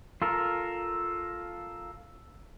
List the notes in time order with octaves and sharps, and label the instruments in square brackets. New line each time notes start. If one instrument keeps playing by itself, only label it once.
[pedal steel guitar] F4 A4 A#4